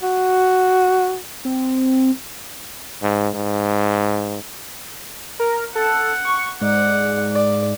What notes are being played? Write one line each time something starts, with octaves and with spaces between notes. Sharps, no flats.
F#4
C4
G#2
G#2
A#4
A4 F#5
C#6
G#2 D5 F#5
D5